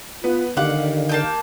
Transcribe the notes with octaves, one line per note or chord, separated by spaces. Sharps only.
B3 F4 B4
D3 D#3 G4 F5 F#5 D6
A#3 A5 G6